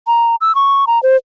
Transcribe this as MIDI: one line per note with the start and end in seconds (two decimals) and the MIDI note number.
0.07 0.36 82
0.41 0.55 88
0.55 0.85 85
0.87 1.01 82
1.03 1.16 72